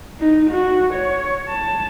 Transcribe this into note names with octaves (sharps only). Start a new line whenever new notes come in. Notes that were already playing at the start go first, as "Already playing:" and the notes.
D#4
F#4
C#5
A5